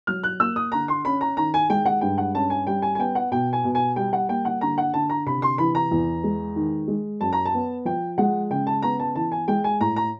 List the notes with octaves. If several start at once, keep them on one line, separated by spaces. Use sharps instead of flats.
F#3 F6
F#6
A#3 E6
D#6
D3 A#5
C6
C#4 B5
A#5
D#3 A#5
G#5
G#3 G5
F#5
G2 G5
F#5
C#4 A5
G#5
G3 G5
G#5
G#5
B3 G5
F#5
B2 G5
G#5
B2
G#5
G3 G5
F#5
A#3 G5
F#5
D3 A#5
F#5
D3 A5
A#5
C3 B5
C6
E3 B5
A#5
E2
G#3
D#3
G#3
F#2 A5
A#5
A5
B3
F3 G5
G#3 F#5
C#3 G5
A5
B3 A#5
A5
E3 A5
G#5
G#3 G5
G#5
A2 A#5
A#5